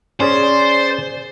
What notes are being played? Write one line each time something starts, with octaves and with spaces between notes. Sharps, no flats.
C#4 G#4 C5 D5